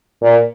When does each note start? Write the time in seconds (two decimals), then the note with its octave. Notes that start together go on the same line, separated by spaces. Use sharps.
0.22 A#2